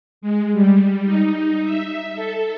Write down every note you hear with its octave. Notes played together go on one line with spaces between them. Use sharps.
G#3
G3
D#4
E5
A4